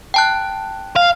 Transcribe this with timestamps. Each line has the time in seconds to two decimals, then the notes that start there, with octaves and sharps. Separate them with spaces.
0.14 G5 A5 F#6
0.96 F5